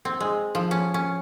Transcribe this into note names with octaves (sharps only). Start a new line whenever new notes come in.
C4
G#3
F3
C#4
C#4